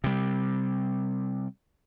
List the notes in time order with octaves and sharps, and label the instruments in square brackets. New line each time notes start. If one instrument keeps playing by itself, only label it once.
[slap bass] C3 G3